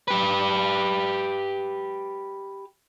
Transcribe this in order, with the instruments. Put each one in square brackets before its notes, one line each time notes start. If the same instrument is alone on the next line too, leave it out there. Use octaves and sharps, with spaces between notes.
[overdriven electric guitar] G4 B4